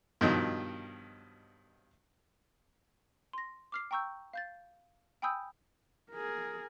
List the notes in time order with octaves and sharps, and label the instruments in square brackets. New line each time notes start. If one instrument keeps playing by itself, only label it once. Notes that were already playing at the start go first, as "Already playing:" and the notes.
[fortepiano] G2 B2 D#3 F3 F#3
[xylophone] C6 A#6
D6 F6 C7
G5 A#5 C#6 E6 G6
F5 G6 A6
G5 G#5 B5 D#6 E6 G6
[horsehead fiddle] G#4 A#4